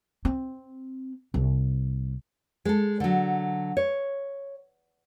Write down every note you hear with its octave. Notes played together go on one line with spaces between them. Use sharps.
C4
C2
G#3 A4
D3 F#3
C#5